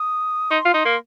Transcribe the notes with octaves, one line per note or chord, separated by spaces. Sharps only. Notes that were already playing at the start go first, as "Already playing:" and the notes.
Already playing: D#6
D#4 C6
F4
D#4
A#3